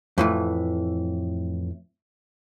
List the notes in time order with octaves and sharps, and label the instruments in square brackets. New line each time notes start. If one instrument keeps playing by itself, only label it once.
[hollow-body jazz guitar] F2 A2 E3